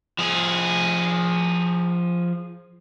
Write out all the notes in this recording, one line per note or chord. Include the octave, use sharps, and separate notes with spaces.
F3 G#4